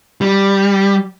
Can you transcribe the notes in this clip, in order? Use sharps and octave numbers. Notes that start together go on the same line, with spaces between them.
G3